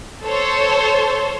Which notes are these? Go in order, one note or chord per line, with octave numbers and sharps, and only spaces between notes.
A4 C5 C#5